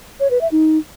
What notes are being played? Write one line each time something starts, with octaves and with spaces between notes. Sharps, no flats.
C#5
B4
E5
D#4